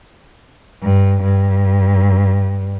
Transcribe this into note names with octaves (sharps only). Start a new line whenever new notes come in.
G2
G2